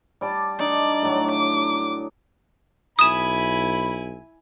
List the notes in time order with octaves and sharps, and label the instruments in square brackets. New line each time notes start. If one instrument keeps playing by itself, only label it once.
[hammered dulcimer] G3 D5 A5
[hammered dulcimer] D4 D#4 [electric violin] D5
[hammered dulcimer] A2 F#3
[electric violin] D6
[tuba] B1 [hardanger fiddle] E4 G#5 [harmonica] B5 [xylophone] D#6 E7